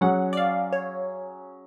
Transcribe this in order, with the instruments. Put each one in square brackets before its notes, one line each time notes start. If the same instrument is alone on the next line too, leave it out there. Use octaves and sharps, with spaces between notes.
[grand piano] F#3 C#4 G#4 [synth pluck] F#5
[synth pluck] D5
F5
C#5